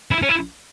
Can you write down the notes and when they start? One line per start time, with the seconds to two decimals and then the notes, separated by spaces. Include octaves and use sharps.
0.11 E4
0.23 C#4
0.29 E4